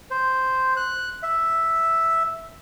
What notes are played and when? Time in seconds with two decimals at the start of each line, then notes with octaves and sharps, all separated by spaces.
0.11 C5
0.77 F#6
1.23 E5